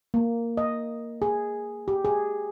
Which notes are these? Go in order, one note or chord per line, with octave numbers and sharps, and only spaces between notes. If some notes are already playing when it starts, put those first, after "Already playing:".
A#3
D#5
G#4
G4
G#4